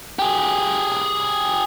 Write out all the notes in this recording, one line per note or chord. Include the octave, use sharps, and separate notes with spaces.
G4 G#4